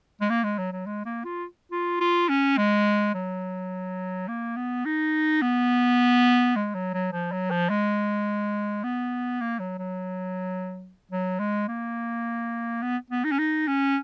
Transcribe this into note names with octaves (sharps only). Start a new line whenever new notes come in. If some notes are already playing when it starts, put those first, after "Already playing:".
G#3
A#3
G#3
F#3
F#3
G#3
A#3
F4
F4
F4
C#4
G#3
F#3
A#3
B3
D#4
B3
G#3
F#3
F#3
F3
F#3
F3
G#3
B3
A#3
F#3
F#3
F#3
G#3
A#3
B3
B3
D#4
C#4
D#4
C#4